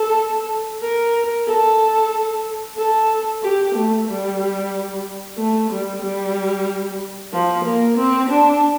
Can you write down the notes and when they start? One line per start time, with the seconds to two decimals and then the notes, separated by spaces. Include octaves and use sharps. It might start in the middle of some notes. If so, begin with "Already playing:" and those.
Already playing: A4
0.82 A#4
1.47 A4
2.77 A4
3.43 G4
3.75 A3
4.07 G3
5.37 A3
5.70 G3
6.02 G3
7.32 F3
7.64 A#3
7.97 C4
8.29 D4